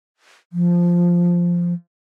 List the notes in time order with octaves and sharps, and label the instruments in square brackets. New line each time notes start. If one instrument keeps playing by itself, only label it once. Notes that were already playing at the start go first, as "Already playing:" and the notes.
[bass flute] F3